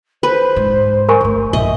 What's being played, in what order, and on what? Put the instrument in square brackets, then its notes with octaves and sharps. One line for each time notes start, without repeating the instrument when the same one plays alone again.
[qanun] B4 [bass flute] C5
[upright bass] G#2
[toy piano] A#4 G#5 C#6
[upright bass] G1 A3
[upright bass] A#1 A#2 [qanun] D#5 [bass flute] E5